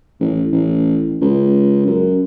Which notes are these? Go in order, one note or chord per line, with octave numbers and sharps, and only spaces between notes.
A1
A1
C#2
F#2